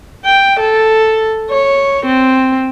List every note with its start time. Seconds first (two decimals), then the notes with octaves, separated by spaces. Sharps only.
0.25 G5
0.60 A4
1.50 C#5
2.06 C4